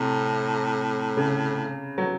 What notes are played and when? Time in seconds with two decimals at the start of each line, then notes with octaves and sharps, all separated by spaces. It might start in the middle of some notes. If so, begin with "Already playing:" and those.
Already playing: A2 C3
1.17 C#3
1.98 F#3